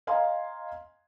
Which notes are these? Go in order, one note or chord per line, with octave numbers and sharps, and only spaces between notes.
D#5 F5 G#5 A#5 C6